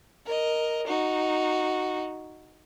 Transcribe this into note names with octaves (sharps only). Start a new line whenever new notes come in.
A#4 D#5
D#4 F#4